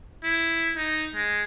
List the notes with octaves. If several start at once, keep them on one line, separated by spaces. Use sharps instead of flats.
E4
D#4
G#3